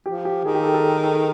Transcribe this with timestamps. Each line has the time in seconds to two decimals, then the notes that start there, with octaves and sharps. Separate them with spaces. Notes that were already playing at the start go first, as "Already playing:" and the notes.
0.06 F3 G4
0.25 G4
0.44 D#3 G#4
0.55 G4
0.64 A4
0.74 A4
0.84 G#4
1.03 A4